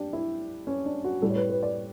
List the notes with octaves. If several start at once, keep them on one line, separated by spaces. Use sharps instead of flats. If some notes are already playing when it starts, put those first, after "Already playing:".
Already playing: D4 G4
E4
C#4
D4
F#4
A2 G3 A4
C#5
B4
B4
D5